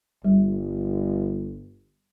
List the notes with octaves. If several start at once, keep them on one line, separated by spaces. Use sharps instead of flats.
G1 G3